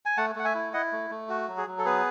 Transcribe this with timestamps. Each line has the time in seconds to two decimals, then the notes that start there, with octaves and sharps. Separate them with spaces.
0.06 G#5
0.17 A3 F#5 A5
0.35 A3 F#5
0.45 E5 G#5
0.54 E4
0.73 E4 D#5 F#5
0.92 A3
1.10 A3
1.29 F#4
1.48 F#3
1.57 G#4
1.67 F#3
1.78 A4
1.85 B3 G#4 B4